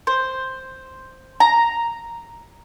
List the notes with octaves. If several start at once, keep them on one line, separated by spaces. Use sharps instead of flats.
C5
A#5